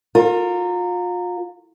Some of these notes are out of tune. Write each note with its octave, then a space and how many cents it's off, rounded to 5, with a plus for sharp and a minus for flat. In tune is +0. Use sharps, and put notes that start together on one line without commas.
F4 +35 A#4 -15